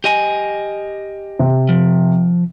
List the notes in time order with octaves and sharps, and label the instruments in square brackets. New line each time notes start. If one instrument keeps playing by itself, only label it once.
[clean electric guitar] G4 D#5 G#5
[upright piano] C3
[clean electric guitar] F3